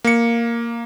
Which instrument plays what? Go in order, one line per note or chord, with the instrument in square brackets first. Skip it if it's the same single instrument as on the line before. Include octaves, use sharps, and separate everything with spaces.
[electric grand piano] A#3 C#7